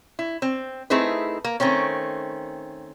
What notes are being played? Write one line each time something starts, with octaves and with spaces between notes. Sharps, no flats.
E4
C4
A3 C4 D#4 E4 G#4 B4
A#3
D#3 A3 C4 C#4